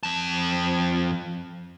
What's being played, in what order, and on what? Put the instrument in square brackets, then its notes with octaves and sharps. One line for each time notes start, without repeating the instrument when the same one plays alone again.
[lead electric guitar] F2 A5